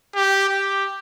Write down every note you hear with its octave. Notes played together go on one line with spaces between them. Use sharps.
G4
G4